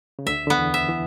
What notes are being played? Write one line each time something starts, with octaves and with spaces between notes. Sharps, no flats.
C#3
D2 D3 E5
D3 B3
E2 E3
E5
E3